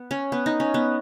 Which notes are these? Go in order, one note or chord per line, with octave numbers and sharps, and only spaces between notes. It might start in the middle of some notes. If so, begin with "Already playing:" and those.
Already playing: B3
C#4
B3
D#4
C#4
B3